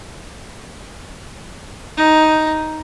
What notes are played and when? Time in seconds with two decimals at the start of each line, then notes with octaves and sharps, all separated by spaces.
1.97 D#4